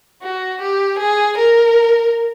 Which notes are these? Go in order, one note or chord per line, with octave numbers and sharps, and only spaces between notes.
F#4
G4
G#4
A#4